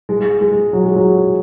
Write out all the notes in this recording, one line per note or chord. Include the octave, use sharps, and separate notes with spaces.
G#3
G#3
F#3
G#3
F#3